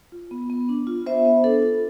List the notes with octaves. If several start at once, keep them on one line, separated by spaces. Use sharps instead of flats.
F4
B3
B3
D4
F4
B3 C5 E5
B3
D4 A4
F4